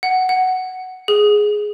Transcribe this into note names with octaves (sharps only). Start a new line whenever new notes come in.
F#5
F#5
G#4